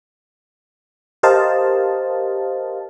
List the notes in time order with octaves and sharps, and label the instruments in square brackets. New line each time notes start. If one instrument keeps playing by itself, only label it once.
[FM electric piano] G4 A#4 C5 D#5 F5 A5